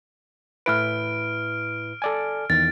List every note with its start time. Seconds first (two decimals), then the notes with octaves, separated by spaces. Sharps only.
0.66 A2 E4 B4 F6 D7
2.02 A4 D5 G#5
2.50 E2 D#3 A6